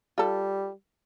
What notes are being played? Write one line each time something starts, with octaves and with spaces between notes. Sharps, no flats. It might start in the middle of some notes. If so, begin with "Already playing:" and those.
G3 F4 A4